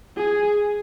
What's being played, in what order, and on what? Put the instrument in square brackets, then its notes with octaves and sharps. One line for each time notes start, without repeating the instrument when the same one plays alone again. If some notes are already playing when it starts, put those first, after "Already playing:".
[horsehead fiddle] G#4